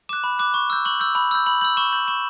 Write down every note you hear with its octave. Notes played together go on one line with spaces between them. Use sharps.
D6 F#6 E7
B5
D6 F#6
C#6
E6 G6
C#6 F#7
E6 G6
B5
E6 G6
B5 F#7
E6 G6 F#7
C#6 E7
G6 F#7
C#6 E7